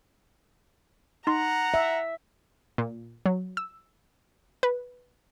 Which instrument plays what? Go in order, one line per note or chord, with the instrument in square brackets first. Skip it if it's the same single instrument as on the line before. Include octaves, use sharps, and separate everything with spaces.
[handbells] D#4 C6 [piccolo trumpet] F#5 [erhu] A#5
[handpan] E5
[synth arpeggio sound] A#2
F#3
E6
B4